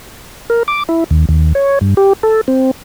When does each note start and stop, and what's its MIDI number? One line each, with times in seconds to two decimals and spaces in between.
0.50 0.63 70
0.68 0.83 86
0.89 1.04 64
1.11 1.25 39
1.29 1.53 39
1.55 1.79 73
1.81 1.94 43
1.97 2.13 67
2.23 2.41 69
2.48 2.71 60